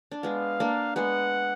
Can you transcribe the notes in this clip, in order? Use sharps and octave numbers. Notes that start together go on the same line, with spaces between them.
D4
G#3 B3 F5
A#3 D4
G#3 B3 F#5